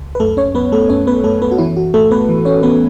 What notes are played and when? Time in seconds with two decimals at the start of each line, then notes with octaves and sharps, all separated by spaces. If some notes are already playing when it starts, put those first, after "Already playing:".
Already playing: C#2
0.15 B4
0.20 F#2 A3 A4
0.37 C#4 C#5
0.55 F#2 B3 B4
0.72 A3 A4
0.89 F#2 C#4 C#5
1.07 B3 B4
1.24 F#2 A3 A4
1.42 B3 B4
1.51 F#4
1.58 E3 E4
1.76 F#4
1.94 A2 A3 A4
2.11 B3 B4
2.29 E3
2.45 C#4 C#5
2.63 E3 B3 B4